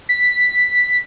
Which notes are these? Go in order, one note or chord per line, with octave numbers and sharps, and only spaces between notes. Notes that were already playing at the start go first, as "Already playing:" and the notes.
B6